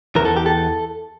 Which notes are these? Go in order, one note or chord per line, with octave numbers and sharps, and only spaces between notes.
E2 E3 A#4
A4
G4
A4